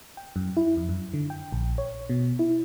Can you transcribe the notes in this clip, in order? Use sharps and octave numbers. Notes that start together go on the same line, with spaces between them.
G5
F#2
E4
F2
F#2
D3
G5
A#1
C#5
B2
E4